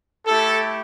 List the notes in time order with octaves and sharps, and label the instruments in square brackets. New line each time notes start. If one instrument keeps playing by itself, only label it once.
[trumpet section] A3 E4 G4 A4